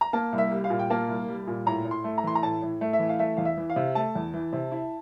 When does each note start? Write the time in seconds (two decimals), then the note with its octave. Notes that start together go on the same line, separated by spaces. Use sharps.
0.01 A#5
0.13 A#3 A5
0.32 C2
0.38 E5
0.51 G3
0.64 F5
0.70 A#2
0.79 G5
0.90 A#3 A5
1.08 C2
1.28 G3
1.47 A#2
1.66 A2 A#5
1.85 A2
1.91 C6
2.04 A3
2.18 A#5
2.24 E3 C6
2.35 A#5
2.43 A2 A5
2.62 A2
2.81 A3
2.93 E5
2.99 E3
3.09 F5
3.19 A3 E5
3.37 E2 F5
3.45 E5
3.57 E3
3.70 F5
3.76 C3
3.95 A3 A5
4.15 E2
4.34 E3
4.53 C3
4.72 E4